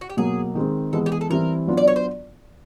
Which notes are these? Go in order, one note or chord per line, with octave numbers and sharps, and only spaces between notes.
F#4
G4
B2 F#3 A#3 G#4
D#3 G#3 C4
E3 G#3 B3 A4
G4
G#4
A4
E3 G3 C4 E4 A#4
F#3 B3 D4 F4
D5
C#5
C5